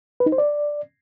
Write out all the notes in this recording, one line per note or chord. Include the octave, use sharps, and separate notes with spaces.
B4
D#4
C5
D5